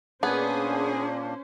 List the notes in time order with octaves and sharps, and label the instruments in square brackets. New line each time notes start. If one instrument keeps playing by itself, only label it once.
[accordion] A#2 A#3 D4 [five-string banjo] B3 [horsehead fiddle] C#4 C5 [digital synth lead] G#4